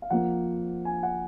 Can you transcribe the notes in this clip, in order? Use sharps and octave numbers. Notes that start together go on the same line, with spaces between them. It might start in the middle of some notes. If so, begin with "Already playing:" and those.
F5
F2 F3 A#3 F#5
G#5
F#5